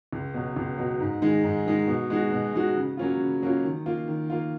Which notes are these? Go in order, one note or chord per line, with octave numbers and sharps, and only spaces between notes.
C#2
B2 F#3
C#2
B2 F#3
G#2
D#3 G#3 D#4
G#2
D#3 G#3 D#4
B2
G#3 D#4 F#4
B2
G#3 D#4 F#4
C#3
F#3 A#3 C#4 F4
C#3
F#3 A#3 C#4 F4
D#3
A#3 F4
D#3
A#3 F4